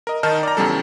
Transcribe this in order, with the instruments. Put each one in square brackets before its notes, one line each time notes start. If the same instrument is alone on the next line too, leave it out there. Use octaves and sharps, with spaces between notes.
[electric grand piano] A#4 D#5
D#3 D#4 A5 F6
D5 A#5
E2 C#3 G3 A4